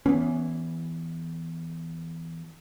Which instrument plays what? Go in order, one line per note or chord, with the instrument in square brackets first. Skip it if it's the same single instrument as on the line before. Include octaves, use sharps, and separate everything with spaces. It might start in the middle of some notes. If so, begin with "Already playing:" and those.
[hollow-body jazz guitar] E2 E3 [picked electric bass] B3 C#4